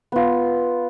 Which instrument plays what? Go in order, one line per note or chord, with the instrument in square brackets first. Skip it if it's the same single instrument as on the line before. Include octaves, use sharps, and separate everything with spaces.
[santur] B3 F4